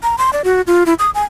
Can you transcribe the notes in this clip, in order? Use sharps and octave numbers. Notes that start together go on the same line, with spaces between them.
A#5
C6
D5
F#4
F4
E4
D#6
G#5